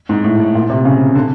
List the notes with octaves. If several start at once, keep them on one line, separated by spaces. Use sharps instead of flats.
G#2
A2
A2
A#2
C3
C#3
D3